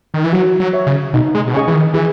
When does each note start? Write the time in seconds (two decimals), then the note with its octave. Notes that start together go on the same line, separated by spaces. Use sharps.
0.14 D#3
0.24 E3
0.33 F#3 F#4
0.60 F#3
0.73 C#5 E5
0.87 C#3
1.13 B2 D#4
1.35 G#3
1.47 B2
1.54 C#3 G#4 D#5 G#5 C#6
1.68 E3
1.74 D#3
1.94 E3 G#4